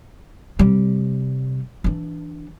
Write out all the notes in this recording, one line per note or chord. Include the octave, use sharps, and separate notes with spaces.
C3 G3
E3 D4